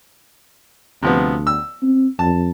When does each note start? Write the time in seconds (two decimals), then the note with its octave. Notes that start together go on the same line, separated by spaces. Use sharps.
1.03 D2 C3 F3 B3
1.47 E6
1.82 C4
2.19 F2 A5